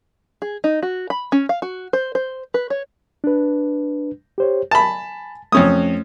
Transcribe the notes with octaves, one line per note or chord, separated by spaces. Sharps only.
G#4
D#4
F#4
B5
C#4
F5
F#4
C5
C5
B4
C#5
D4 B4
G4 C5 C#5
G#5 A5 B5
F2 A3 C#4 D#6